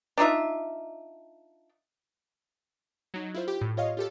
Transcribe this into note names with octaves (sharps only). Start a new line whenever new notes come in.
D4 D#4 F4 E5
F#3 D#4
E4 F4 C5
G4
A2
F4 C#5 D#5 F5
F4 G4 A4